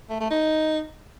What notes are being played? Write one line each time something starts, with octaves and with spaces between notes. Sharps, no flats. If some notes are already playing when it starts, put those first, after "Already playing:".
A3
A3
D#4